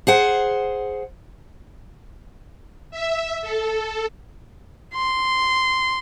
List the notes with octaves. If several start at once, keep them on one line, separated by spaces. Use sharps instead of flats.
G#4 C5 F#5
E5
A4
C6